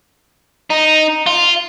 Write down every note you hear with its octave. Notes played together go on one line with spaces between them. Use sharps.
D#4
F4